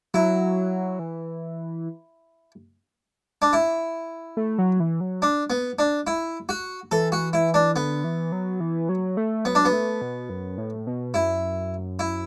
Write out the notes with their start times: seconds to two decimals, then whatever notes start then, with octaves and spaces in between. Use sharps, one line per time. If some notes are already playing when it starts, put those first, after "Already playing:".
0.14 F#3 E4
0.99 E3
3.42 D4
3.53 E4
4.37 A3
4.58 F#3
4.80 E3
5.00 F#3
5.22 D4
5.50 B3
5.79 D4
6.07 E4
6.49 F#4
6.92 E3 A4
7.12 F#4
7.33 E4
7.54 D4
7.76 D3 B3
8.04 E3
8.32 F#3
8.60 E3
8.89 F#3
9.17 A3
9.45 F#3 B3
9.55 D4
9.65 B3
9.73 A3
10.02 B2
10.29 F#2
10.58 A2
10.87 B2
11.14 F#2 E4
11.99 E4